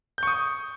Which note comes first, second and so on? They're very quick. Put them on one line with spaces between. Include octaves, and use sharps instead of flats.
G6 C#6 D#6